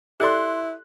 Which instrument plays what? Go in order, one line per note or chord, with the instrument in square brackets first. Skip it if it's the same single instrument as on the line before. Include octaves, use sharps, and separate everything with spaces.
[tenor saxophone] E4 [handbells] G4 A4 D5 [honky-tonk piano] C6 F#6